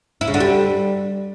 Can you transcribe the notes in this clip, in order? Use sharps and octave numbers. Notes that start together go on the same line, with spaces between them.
E4
C#3
D3
G3